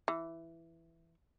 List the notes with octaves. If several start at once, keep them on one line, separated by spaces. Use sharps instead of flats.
E3